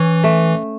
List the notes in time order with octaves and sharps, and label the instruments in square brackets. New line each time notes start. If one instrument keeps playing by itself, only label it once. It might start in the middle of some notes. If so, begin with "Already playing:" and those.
Already playing: [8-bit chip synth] E3 [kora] C#4
[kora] A3